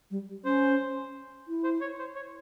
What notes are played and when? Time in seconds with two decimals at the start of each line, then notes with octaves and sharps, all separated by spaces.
0.11 G3
0.44 C#4 C5
1.48 E4
1.64 C5
1.81 C#5
1.99 C5
2.16 C#5